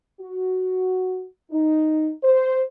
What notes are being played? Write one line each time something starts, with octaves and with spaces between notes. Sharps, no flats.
F#4
D#4
C5